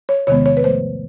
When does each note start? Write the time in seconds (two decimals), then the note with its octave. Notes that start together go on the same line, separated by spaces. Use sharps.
0.09 C#5
0.27 E2 C3 D#3 G#3 B3 C#5
0.46 C#5
0.57 B4
0.64 G#2 F3 A3 C5